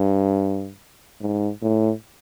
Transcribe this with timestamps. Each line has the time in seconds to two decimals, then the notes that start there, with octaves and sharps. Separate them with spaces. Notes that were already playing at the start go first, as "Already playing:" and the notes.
Already playing: G2
1.21 G#2
1.62 A2